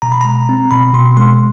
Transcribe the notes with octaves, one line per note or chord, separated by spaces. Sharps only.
B2 A#5
B5
G#3 A#5
C4
B2 B5
B2 C6
G#3 C6